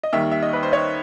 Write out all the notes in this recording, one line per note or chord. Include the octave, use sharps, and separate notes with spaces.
D#5
D#2 D#3 G3 E5
E5
D#5
B4
C5
C#5